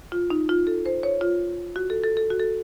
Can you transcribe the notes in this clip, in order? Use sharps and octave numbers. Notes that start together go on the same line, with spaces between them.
F4
D#4
F4
A4
C5
C#5
F4
F#4
A4
A4
A4
F#4
A4